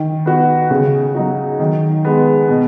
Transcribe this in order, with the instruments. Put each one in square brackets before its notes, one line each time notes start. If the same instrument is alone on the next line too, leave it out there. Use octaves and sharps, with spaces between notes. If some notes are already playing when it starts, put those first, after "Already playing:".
Already playing: [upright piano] D#3
B3 F#4
C#3
F#3 D#4 F#4
D#3
G#3 B3
B2